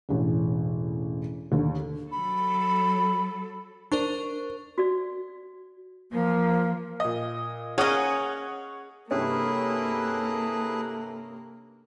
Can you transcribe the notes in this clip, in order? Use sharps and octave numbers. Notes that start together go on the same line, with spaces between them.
E1 A1
D#2 D3
F#3 A4 B5
D4 A#4 C5 C#6
F#4 D5
F3 A#3
A#2 D#5
A#3 C#4 G#4 C#5 D#5 F#5 D#6
G2 C3 A#3 C#4 E4 G#4 A4 B4